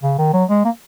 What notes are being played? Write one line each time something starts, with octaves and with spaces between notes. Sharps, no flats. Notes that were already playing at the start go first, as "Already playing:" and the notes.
C#3
D#3
F#3
G#3
A#3